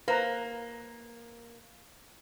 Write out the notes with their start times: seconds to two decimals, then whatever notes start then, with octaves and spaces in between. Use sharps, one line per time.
0.08 A#3 B4 C5 A#5